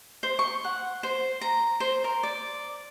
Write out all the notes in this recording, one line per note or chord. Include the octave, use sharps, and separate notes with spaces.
C5
C#6
F#5
C5
A#5
C5
A#4
D5